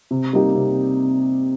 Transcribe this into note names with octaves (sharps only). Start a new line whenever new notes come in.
C3
G3 A#3 D#4 G4
C3